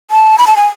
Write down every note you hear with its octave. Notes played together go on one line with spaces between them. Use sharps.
A5
B5
A5
G#5